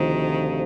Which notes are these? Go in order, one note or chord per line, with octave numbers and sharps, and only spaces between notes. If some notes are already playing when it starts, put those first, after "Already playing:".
Already playing: D2 C3 D#3 F3